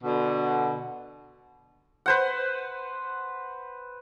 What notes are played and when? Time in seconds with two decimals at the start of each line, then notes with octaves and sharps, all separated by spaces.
0.04 B2 D3
2.06 B4 C5 F#5